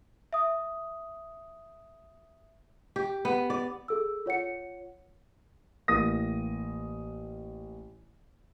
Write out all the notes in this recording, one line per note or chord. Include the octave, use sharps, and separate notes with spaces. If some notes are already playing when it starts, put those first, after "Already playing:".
E5 D#6
G4
B3
D5
G#4 A4 E6
F4 C#5 F#5 C#7
A1 A#3 D#6 A#6